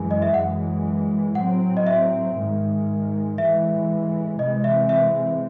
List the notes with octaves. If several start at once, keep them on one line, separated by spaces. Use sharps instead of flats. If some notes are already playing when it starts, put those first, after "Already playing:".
Already playing: F#2 E3 G#3 G#5
D#5
E5
F#2 E3 G#3 F#5
A2 F#3 C4 F#5
D#5
E5
G#2 D#3 G#3
A2 E3 G#3 E5
C3 E3 G#3 C4 D#5
E5
E5